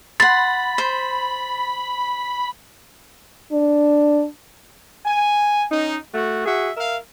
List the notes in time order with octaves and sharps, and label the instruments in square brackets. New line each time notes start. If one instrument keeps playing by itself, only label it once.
[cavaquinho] F#5 C6 [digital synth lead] B5 [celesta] A6
[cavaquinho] C5
[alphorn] D4
[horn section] G#5
C#4 D#4
A3 F#4
F#4 G#4 E5
A#4 E5 F5